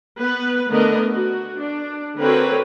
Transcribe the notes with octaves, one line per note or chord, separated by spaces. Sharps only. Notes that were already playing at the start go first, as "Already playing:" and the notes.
B3 B4
D3 A3 B3 A#4 B4 D#5
F#4
D4
D3 C4 F#4 A#4 B4 C#5